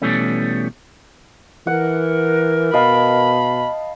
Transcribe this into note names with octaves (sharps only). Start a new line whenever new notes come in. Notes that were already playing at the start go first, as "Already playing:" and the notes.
B2 E3 G3 A3 C#4
E3 A#4 F#5
B2 D#5 F5 A5 B5